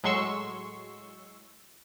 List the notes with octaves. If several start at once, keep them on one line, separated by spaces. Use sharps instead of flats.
A2 F#3 G#3 C6 C#6 E6